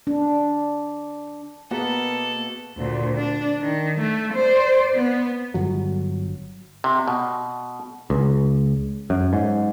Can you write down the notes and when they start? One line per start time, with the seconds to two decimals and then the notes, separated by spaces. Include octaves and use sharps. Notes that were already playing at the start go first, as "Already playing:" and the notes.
0.07 D4
1.71 B2 A#3 B3 G#4 A4 A#5
2.77 D2 A#2
3.17 D4
3.62 D#3
4.01 A3
4.34 C5 D5
4.96 B3
5.54 G1 F#3
6.84 C3
7.08 B2
8.10 C#2
9.10 F#2
9.33 G#2